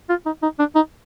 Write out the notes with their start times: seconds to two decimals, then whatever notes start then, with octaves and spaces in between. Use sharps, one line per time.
0.09 F4
0.26 D#4
0.42 D#4
0.59 D4
0.75 D#4